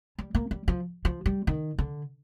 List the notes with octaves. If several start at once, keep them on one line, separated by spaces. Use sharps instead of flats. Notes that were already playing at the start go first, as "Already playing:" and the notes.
G3
A#3
G3
F3
F3
G3
D#3
D3